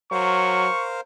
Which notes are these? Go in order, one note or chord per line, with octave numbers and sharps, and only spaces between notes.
F#3 A#4 C5 F5 C#6